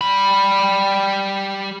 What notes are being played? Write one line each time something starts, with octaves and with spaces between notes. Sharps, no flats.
G3 B5